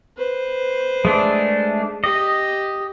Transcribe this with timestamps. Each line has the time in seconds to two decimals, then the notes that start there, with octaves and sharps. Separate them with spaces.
0.17 B4 C5
1.05 G#3 A3 D4
2.04 G4 D#5